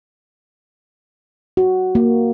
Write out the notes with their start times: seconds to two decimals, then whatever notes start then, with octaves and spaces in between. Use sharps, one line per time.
1.57 F#4
1.95 A#3